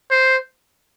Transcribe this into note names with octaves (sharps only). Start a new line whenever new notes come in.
C5